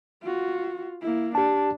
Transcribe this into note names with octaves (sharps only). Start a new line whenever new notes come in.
F4 F#4
A#3 E4
D4 G4 A5